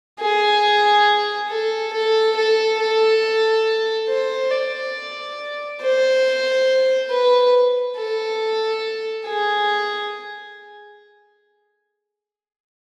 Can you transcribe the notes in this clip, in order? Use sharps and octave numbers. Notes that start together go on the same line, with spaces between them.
G#4
A4
A4
A4
A4
C5
D5
C5
B4
A4
G#4